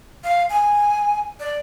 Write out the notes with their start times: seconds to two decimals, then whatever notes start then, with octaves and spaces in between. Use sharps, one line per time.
0.24 F5
0.50 G#5
1.40 D5